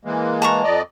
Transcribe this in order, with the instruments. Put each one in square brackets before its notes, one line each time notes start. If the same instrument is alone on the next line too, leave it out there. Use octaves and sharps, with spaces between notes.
[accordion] E3 G#3 A#3
[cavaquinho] A5 A#5 C#6
[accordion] F2 D5 D#5